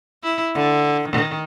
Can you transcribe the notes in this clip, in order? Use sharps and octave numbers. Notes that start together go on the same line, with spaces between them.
E4
D3
D#3